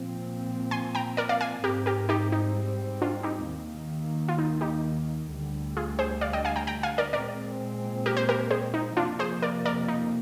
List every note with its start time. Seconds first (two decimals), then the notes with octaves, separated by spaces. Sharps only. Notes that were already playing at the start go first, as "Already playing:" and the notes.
Already playing: A#2 F3 C4
0.71 G#5 C6
0.95 G5 A#5
1.17 A#4 D5
1.29 D5 F5
1.41 F5 G#5
1.63 G#2 G3 C4 G4 A#4
1.86 G4 A#4
2.09 D#4 G4
2.32 D#4
3.02 D4 F4
3.23 D#4 G4
3.47 D#2 D#3 A#3
4.28 F4
4.38 D#4
4.61 D#4 G4
5.30 D2 D3 G3
5.77 F4 G#4
5.99 G#4 C5
6.21 D5 F5
6.33 D#5 G5
6.45 F5 G#5
6.56 G5 A#5
6.67 G5 A#5
6.83 F5 G#5
6.98 A#4 D5
7.13 A#2 G#3 C4 A#4 D5
8.06 G4 A#4
8.17 C5
8.29 G4 A#4
8.50 G#4 C5
8.74 D#4
8.96 F2 C3 F3 A#3 D4 F4
9.19 G#4 C5
9.42 A#4 D5
9.65 A#4 D5
9.88 D#4